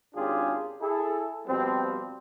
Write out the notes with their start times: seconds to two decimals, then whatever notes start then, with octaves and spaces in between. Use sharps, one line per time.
0.15 G#1 C#4 D4 F4 G4 G#4
0.80 E4 G#4 A4
1.48 B2 F3 G3 C4